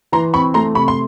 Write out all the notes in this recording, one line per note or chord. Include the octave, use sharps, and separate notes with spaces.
E3 A#5 C6
C4 B5 C#6
A3 A#5 C6
C3 B5 C#6
C6